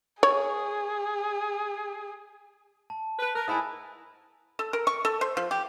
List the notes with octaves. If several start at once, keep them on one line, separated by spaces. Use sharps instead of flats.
G#4 C#5
A5
B4
A#4 F#6
G#2 A3 E4 G#5 B5 D#6
A4
A#4
C#6
A4
C5
F3
G4